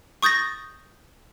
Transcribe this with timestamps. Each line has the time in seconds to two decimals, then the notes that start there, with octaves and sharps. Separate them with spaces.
0.22 C#6 D#6 G6 A6 A#6